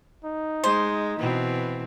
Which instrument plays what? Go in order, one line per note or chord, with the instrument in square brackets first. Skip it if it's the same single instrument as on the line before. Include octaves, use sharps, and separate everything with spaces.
[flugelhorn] D#4
[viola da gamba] G#3 [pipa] C5
[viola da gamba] B2 E3 C4